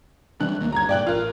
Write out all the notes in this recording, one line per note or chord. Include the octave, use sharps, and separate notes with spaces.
E3 G3 D4 F#6
D2 D#3 A#3
D2 G2 A#5 G#6
G2 A#2 D5 G5 F#6
A1 F4 A#4